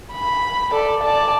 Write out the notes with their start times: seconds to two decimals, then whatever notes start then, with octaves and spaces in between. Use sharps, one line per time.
0.13 B5
0.72 A4 D5
1.02 D5 A5